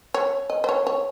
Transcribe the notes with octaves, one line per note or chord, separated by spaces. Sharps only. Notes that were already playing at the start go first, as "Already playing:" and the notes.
C#5
D#5
C5
C#5
C#5